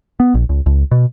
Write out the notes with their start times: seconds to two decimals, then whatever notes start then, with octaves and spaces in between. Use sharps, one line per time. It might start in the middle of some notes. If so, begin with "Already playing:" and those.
0.20 B3
0.34 A#1
0.49 C#2
0.66 C#2
0.91 B2